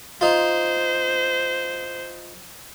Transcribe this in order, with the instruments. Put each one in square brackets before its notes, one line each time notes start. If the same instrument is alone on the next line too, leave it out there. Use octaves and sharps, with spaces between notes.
[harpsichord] D#4 F4 [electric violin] C5